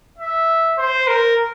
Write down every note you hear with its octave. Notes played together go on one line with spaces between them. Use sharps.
E5
C5
A#4